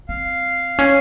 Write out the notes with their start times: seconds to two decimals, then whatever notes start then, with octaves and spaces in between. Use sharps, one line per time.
0.08 C4 F5
0.79 C#4